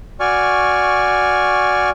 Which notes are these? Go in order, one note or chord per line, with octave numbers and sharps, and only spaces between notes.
F#4 D5 G#5 C#6 F6